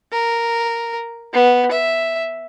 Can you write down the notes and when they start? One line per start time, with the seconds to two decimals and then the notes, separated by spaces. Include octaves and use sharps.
0.12 A#4
1.33 B3
1.71 E5